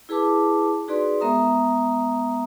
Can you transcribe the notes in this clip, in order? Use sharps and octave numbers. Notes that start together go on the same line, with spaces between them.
E4 G#4 B4 A5 D6
D#4 F#4 G#4 B4 D5 C6
G#3 B3 A#4 E5 A#5 D#6